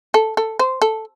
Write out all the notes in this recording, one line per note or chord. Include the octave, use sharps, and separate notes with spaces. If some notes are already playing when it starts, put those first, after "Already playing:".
A4
A4
C5
A4